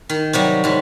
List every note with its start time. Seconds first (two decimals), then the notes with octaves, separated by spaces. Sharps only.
0.09 D#3
0.33 C3 F#3 G3
0.64 G#2 F#3